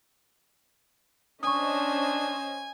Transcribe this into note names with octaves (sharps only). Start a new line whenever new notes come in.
C#4 D4 C5 D#5 G#5 C#6 D#6